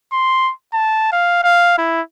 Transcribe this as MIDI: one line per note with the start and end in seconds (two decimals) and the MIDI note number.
0.13 0.52 84
0.74 1.08 81
1.12 1.41 77
1.44 1.77 77
1.78 2.01 64